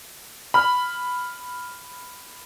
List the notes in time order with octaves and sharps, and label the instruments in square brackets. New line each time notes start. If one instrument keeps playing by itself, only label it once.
[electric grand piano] B5 F6